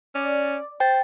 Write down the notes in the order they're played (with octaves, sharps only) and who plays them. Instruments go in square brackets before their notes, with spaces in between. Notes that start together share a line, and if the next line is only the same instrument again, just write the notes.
[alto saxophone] C#4 [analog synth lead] D5
[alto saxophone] C5 [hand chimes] G5 [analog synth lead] A6